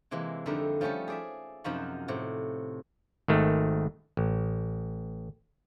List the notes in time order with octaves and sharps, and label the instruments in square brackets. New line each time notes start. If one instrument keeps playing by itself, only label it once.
[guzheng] C3 E3 G#3 A#3
F2 D3 G3 D#4 A#4 E5
F3 G3 A3 C#4 A4
G#4 D5 E5
F#2 C3 F3 D#4 F#4 B5
A2 C3
[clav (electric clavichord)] G#1 D#3 A3
A1